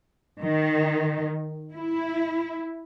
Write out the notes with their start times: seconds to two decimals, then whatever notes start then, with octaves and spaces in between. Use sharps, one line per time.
0.40 D#3
1.74 E4